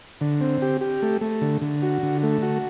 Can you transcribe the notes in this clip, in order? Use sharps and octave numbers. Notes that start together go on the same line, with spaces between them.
D3
C4
G4
G4
A3
A3
D3
D3
F#4
D3
A3
F#4